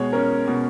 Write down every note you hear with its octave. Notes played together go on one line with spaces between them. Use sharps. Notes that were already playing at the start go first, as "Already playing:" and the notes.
Already playing: B2 G#3 C#5
C#4 A#4
B2